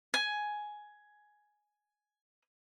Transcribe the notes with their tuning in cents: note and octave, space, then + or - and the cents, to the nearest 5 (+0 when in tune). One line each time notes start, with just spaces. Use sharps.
G#5 +10